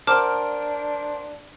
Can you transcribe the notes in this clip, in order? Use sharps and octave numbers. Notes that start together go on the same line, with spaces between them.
D4 A#4 C5 F#5 A5 D6 F6